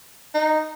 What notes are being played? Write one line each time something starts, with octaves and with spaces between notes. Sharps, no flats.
D#4